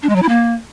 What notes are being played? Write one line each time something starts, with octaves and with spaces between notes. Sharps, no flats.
D4
G#3
F#3
E4
A#3